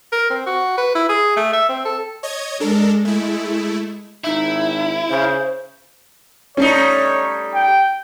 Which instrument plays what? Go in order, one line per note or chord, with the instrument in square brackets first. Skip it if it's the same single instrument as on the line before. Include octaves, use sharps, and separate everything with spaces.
[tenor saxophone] A#4
C4
F#4
B4
E4
G#4
A3
E5
C4
A4
[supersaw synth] C#5 D#5 G#6
[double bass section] G#3 [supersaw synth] D4 A4 A#4
[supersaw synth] A3 E4
[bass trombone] G#1 [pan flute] D#4 [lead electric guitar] E4
[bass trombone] C#3 [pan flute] C5
[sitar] G3 A3 D#4 [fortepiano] C#4 [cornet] C#5
[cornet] G5